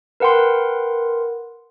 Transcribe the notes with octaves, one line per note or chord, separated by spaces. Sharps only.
A#4 B4 F#5 G5 C6